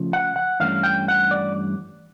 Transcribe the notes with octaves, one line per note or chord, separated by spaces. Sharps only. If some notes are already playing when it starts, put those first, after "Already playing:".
Already playing: C#3 F3 A3
F#5
F#5
G2 E3 A3 C#4 F5
G5
F#5
D5